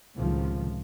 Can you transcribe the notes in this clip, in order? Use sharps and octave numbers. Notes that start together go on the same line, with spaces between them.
C#2 A2 C3 D#3 F3